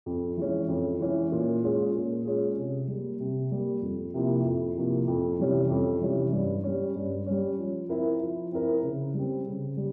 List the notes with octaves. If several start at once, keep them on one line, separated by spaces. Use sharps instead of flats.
F2
E3 G#3 C#4
F2
E3 G#3 C#4
A#2
G#3 C#4 F4 G#4
A#2
G#3 C#4 F4 G#4
C3
G3 A#3
C3
G3 A#3
F2
C3 F3 A#3 E4
F2
C3 F3 A#3 E4
F2
C3 E3 G3 C#4
F2
C3 E3 G3 C#4
G2
G3 C#4
G2
G3 C#4
F3
C4 E4 A#4
F3
C4 E4 A#4
C#3
G3 C4
C#3
G3